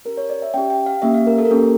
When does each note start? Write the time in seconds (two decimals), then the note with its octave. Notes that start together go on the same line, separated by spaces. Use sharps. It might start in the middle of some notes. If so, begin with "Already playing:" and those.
0.05 C#4 G4 A#4
0.17 C#5
0.30 D5
0.42 E5
0.54 C#4 G4 G5
0.70 G5
0.86 F5
1.02 A#3 C#4 G4 E5
1.14 F5
1.27 A#4
1.38 A4
1.45 A#4
1.50 A#3 C#4 G4 A4